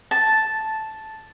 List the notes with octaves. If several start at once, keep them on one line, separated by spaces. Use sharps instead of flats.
A5